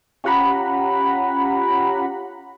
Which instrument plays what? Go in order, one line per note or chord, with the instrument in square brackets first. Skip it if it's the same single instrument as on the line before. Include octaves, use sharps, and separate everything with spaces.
[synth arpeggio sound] C#4 F4 G4 F#5 A#5 B5